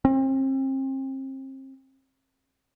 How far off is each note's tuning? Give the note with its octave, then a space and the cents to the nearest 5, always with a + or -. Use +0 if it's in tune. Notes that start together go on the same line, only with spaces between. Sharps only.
C4 +35